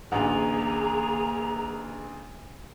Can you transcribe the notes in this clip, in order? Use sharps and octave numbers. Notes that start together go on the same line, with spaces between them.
A1 D2 A#3 G#4 A#5